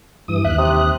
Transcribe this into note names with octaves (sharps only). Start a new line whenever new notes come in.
G2 E3 D#6
D#2 E5 F#6
C3 D#6